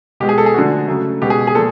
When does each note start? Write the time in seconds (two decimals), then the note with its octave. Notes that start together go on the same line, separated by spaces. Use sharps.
0.20 B2 G#3 G4
0.29 G#4
0.38 A4
0.46 G#4
0.54 D3 F3 A3 F#4
0.88 C#3 F#3 A3
1.22 B2 G#3 G4
1.30 G#4
1.47 G#4
1.55 A#2 F3 A4